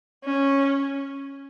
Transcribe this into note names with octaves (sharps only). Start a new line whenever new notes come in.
C#4